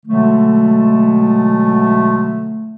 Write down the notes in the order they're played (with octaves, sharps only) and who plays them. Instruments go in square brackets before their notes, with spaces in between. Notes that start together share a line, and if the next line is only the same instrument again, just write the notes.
[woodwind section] B2 D3 F#3 G#3 A3